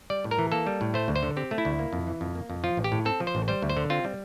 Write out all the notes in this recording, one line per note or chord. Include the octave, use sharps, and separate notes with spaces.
G3 D5
A2
A#4
E3
A#3 A4
G3
A2
A3 C5
D2
C5
D3
C4 G4
A3
E4
D2
A#3
F2
E3
F2
A#3
F2
F3 F4
A1
G4
A2
C4 A4
F3
C5
A1
G3 C5
D2
C5
D3
C4 F4
G3